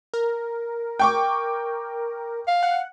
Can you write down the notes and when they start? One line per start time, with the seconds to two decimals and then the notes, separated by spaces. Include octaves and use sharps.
0.14 A#4
0.99 G5 C#6 D6
2.48 F5
2.63 F#5